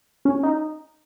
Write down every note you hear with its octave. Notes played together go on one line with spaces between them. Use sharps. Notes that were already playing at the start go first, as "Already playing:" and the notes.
C#4
D#4